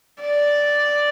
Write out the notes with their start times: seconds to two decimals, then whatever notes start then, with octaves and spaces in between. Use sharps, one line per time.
0.22 D5